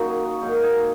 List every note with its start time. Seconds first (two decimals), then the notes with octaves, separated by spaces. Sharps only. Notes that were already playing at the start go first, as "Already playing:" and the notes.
Already playing: F#2 D#3 A#3 D#4 F#4
0.10 G#4
0.25 F#4
0.42 G#2 F#3 A#3 D#4
0.63 G#4